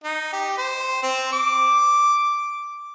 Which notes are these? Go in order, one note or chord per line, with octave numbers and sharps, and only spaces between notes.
D#4
G4
C5
C4
D6